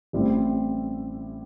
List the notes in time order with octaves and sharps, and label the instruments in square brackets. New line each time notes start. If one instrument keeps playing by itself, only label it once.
[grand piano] A1 A2 G3 C4 E4